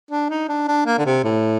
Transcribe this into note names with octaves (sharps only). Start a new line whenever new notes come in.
D4
D#4
D4
D4
A#3
D3
C3
A2